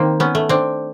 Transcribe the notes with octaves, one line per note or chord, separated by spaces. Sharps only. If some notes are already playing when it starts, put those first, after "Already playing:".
Already playing: D#3 A#3 C4
B3 C#4
A3
C4 D4